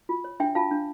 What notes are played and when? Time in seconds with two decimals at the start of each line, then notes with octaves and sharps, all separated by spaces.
0.09 F4
0.24 C#5
0.40 D4 E5 G5
0.55 F4 F5 A5
0.71 D4